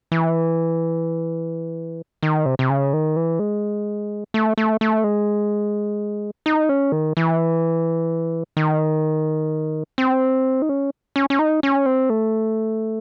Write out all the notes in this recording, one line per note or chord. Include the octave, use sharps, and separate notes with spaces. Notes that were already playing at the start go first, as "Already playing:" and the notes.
E3
D#3
C3
C3
C#3
D#3
E3
G#3
A3
A3
A3
G#3
D#4
C#4
D#3
E3
D#3
C4
D#4
C#4
C#4
C#4
D#4
C#4
C4
A3